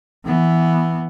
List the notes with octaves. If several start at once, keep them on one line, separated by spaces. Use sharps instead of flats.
E3 B3